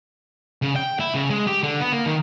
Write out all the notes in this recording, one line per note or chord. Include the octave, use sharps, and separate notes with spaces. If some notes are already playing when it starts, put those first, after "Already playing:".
C#3
G5
E4
C#3
G#3
G4
D3
B3
A#3
D#3